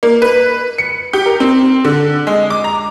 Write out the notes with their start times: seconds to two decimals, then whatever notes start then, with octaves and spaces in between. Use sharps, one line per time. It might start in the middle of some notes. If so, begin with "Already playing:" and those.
0.03 A#3
0.22 B4
0.78 C#7
1.13 G4
1.26 A#4
1.40 C4
1.85 D3
2.27 G#3
2.50 D6
2.64 A#5